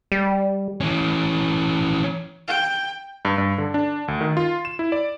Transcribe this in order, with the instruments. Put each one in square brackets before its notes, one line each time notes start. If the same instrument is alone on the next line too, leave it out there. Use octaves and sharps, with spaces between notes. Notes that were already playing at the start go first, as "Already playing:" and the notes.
[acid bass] G3
[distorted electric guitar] E3 C#4
[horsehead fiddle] G5
[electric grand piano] G2
G2
D3
D4
D2
D#3
F4
E7
E4
D5